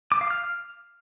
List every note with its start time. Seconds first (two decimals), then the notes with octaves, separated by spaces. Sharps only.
0.12 D6
0.21 F5
0.31 F6